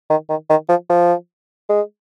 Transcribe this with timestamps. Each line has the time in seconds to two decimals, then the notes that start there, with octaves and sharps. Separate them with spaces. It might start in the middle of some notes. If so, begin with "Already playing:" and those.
0.10 D#3
0.30 D#3
0.50 D#3
0.69 F3
0.90 F3
1.69 G#3